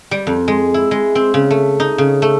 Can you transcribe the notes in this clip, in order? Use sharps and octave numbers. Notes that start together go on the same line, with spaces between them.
G3
F2
G#3
E4
G#3
C4
C#3
A3
D#4
C#3
A3